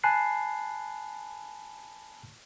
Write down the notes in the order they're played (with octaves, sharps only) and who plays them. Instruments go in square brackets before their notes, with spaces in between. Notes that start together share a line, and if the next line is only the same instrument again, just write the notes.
[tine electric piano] G#5 A5 B5 F#6 C7